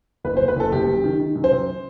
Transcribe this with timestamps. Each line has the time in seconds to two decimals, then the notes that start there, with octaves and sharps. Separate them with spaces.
0.24 F#1 B4
0.37 F#1 C5
0.48 B4
0.56 F#1 A4
0.72 F#1 G4
0.88 F#2
1.04 D#3
1.19 D#3
1.36 F#2
1.44 C5
1.52 F#2